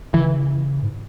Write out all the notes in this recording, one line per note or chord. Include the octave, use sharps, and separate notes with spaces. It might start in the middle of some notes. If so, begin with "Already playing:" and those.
C#3 E3
G#2